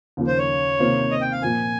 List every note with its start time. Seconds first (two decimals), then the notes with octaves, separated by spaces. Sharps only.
0.17 D#2 C#3 F3 A#3
0.27 C5
0.38 C#5
0.79 C3 D#3 A#3 F4 C5
1.11 D#5
1.22 G5
1.32 F5
1.42 A#2 F3 A#3 G#5